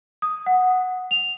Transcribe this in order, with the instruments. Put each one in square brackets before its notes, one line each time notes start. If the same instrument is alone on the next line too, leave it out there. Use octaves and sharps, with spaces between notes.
[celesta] D#6
F#5
F7